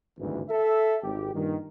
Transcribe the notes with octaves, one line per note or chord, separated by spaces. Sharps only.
G#1 D2 G2 A#2 E3
A4 E5
G#1 G4
G2 A#2 D#3